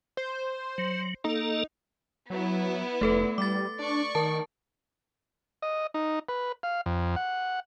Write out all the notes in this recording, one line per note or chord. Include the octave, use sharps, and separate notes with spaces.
C5
F#3
A#3 D#4 A4
F#3 B3 E4
F1 A3 A4 B4
G3 D6 A6
D4 D5 C#6
D#3 A#4 A5
D#5
D#4
B4
F5
F2
F#5